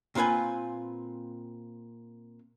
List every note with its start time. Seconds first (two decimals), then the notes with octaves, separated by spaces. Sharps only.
0.15 A#2 C4 F4 B4 G#5